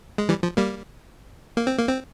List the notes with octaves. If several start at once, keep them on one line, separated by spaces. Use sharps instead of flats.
G#3
E3 G3
F3
G3 A#3
A#3
C4
A#3
C4